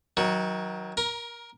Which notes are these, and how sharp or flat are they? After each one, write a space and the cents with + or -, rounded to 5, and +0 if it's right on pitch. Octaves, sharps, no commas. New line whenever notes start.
D#3 +30 F#3 +0
A#4 +15 A#5 +35